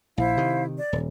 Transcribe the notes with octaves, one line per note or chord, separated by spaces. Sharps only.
A#1 E4 C5 F5
C3 D#3
D5
D#1